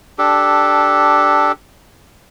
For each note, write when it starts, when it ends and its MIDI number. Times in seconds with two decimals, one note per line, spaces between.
0.18 1.52 62
0.18 1.52 67
0.18 1.52 69